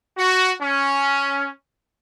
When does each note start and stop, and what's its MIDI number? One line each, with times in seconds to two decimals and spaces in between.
0.18 0.51 66
0.61 1.48 61